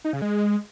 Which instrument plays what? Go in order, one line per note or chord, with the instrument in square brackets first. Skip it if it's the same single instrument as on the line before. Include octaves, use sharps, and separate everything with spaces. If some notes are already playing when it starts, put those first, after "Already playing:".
[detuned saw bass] D#4
C#3
G#3